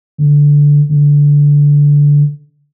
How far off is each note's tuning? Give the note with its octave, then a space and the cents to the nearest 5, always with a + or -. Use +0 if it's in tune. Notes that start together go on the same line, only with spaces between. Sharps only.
D3 -10
D3 -15